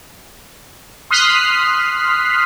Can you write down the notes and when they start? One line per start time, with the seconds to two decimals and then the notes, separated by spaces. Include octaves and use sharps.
1.11 C6 D#6 F6 F#6 B6 C7